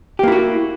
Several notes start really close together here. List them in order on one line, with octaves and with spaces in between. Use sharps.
G4 A#3 E4 F#4